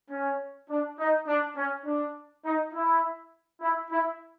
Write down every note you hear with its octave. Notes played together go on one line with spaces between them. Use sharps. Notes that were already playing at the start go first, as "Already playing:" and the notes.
C#4
D4
D#4
D4
C#4
D4
D#4
E4
E4
E4